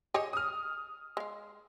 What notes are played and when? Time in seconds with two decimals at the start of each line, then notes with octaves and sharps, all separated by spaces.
0.14 G4 G#4 C#5 D#5
0.33 D#6 F6
1.17 G#3 F5